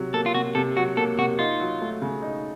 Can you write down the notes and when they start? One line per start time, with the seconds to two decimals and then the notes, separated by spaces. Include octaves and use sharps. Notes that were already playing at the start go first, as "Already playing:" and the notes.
Already playing: C3 F#3
0.13 A#3 A4
0.26 F4
0.34 C3 F#4
0.55 C3 A4
0.76 F#3 F#4
0.97 A#3 A4
1.17 C3 F#4
1.39 D#4 F4
1.60 F#3
1.82 A3
2.02 C#3
2.22 D#4